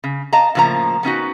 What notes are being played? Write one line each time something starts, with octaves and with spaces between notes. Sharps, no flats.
C#3
D#5 F5 A5 A#5
A2 C#3 F3 A#3 A#5
B3 C#4 D#4 F#4